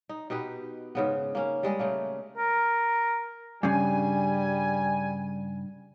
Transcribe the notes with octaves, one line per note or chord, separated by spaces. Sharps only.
D#4
B2 D#4 G4 B4
G#2 C#3 B3
A#3 C#4
G3 G#3 G#4 D#5
C#3 A3 A#3
A#4
G2 C#3 G3 G#5